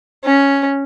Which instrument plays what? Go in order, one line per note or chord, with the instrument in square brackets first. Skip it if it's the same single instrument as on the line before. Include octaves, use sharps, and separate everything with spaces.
[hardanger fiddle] C#4